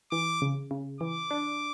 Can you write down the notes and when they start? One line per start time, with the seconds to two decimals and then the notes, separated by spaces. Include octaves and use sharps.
0.12 E3 D6
0.42 C#3
0.71 C#3
1.01 E3 D6
1.31 D4